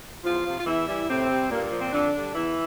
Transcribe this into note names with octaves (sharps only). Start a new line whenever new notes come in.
E2 F3 F4
C3 F3
F4
E2 E3 E4
E3 G3
A2 C3 C4
G3
G2 A#2 A#3
A#3
F3
C4
F2 D3 D4
D3 G3
E2 E3 E4